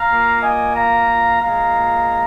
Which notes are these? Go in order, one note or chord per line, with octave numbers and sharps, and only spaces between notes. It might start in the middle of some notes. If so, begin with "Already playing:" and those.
Already playing: F5 A#5
A#2 A#3
D#5 G#5
F5 A#5
A#2 G#3 F5 A#5